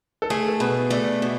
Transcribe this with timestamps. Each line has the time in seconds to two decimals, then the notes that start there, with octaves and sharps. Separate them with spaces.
0.22 A4
0.30 A3 G#4
0.48 A4
0.60 B2 B4
0.90 A3 D5
1.22 B2